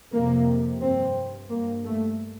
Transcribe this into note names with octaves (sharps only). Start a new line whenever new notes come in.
F2 C3 A#3
G2 C4
G2 A#3
A3